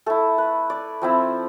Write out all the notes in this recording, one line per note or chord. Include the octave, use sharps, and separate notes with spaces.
A3 E4 A4
B4
D5
F3 C4 E4